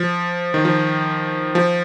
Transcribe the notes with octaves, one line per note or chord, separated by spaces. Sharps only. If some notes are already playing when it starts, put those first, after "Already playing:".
Already playing: F3
D#3
F3
F3